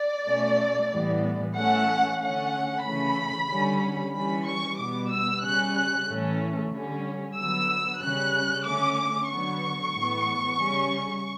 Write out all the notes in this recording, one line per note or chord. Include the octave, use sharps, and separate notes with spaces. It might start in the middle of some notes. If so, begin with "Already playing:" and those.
Already playing: D5
B2 A3 C#4
A2 E3 G3 B3
E3 A3 C#4 F#5
D3 A3 C#4 F#5
C#3 E3 A3 C#4 B5
D3 G3 C#4
E3 G3 C#4 B5
C#6
B2 G3 B3 D6
E6
C#3 G3 C#4 F#6
F#6
A2 E3 A3 C#4
D3 G3 C#4
D3 F#3 B3 E6
C#3 G3 C#4 F#6
D3 A3 C#4 D6
D3 F#3 B3 C#6
A2 E3 B3
C#3 G3 C#4